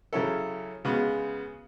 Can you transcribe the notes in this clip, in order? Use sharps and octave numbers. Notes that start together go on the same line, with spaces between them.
C#3 F#3 C#4 E4 A4
C#3 G#3 B3 F#4